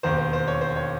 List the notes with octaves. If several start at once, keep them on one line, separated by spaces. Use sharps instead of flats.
E1 D#2 D#3 C5
C5
C5
C#5
C5
C#5